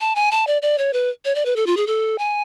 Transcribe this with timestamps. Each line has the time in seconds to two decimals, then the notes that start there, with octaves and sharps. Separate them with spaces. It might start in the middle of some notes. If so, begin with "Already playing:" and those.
0.01 A5
0.15 G#5
0.31 A5
0.47 D5
0.62 D5
0.78 C#5
0.93 B4
1.25 C#5
1.35 D5
1.45 B4
1.56 A4
1.66 F4
1.77 G#4
1.87 A4
2.18 G#5